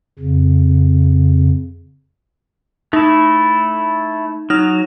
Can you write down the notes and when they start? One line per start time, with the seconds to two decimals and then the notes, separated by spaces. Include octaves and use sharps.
0.19 F2 C#3
2.93 A3 D#4 E4
4.50 F#3 D#4 F6